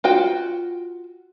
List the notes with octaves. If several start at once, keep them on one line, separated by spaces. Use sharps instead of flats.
F4 F#4 G5